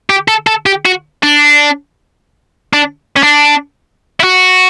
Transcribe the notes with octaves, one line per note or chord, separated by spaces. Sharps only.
G4
A4
A4
G4
F#4
D4
D4
C#4
D4
E4
F#4